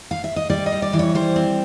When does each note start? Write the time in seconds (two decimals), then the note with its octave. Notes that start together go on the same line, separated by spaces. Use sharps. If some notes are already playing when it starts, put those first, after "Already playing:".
0.11 F5
0.24 E5
0.36 D#5
0.50 G3 D5
0.66 D#5
0.72 G3
0.82 D5
0.93 E3
0.99 C#5
1.15 G3 C5
1.36 C4